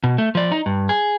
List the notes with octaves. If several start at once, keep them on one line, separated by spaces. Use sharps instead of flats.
B2
A3
F3 D5
D#4
G2
G#4